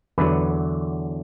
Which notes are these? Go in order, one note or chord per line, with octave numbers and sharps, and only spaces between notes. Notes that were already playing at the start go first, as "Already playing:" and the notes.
E2 D3 F#3 B4